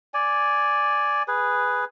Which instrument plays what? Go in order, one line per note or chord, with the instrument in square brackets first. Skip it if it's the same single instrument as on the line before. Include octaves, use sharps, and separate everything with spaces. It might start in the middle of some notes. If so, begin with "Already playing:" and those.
[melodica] D5 G#5
G#4 B4